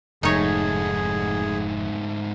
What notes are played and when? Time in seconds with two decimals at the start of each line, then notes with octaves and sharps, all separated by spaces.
0.23 F1 G#2 A3 D#4 G#4 C#5